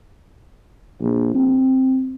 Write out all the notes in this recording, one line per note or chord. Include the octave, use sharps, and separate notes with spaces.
A#1
C4